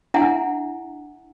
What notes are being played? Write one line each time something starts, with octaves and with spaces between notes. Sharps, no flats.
D4 E4 E5 F#5 G#5 A#5